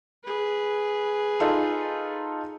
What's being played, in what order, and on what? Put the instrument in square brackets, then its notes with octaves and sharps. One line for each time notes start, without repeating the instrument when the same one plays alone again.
[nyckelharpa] G#4 B4
[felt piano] D#4 F4 A4